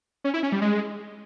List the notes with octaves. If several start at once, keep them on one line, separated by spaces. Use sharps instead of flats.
C#4
E4
C#4
G3
G#3